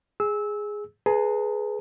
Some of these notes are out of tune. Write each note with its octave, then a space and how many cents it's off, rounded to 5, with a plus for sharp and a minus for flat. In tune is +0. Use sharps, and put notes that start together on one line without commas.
G#4 +0 E6 -20
G#4 +20 B4 +0 A#5 -40